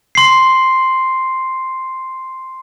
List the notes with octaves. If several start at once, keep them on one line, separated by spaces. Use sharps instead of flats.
C6 C7